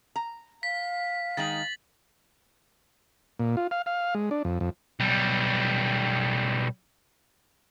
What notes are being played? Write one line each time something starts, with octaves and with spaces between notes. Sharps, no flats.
A#5
F5 B6
D#3 G#3 D#4 A6 F#7
A#2
F4
F5
F5
G#3
D4
F2
F2
B1 G3